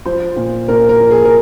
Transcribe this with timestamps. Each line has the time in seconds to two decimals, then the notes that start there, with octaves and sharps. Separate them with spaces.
0.06 F3 C5
0.36 A#2
0.68 A#2 A#4
0.89 A#4
1.00 F3
1.11 G#4
1.25 A#4